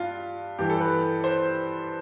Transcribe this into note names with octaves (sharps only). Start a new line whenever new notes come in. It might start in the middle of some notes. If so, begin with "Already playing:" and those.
Already playing: G2 F4
G2 E3 G4
A4
B4
C5